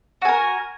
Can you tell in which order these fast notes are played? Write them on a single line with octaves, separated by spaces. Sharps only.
F#4 G#5 A#4